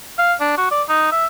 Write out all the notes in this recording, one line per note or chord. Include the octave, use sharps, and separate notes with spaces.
F5
D4
F#4
D5
D#4
E5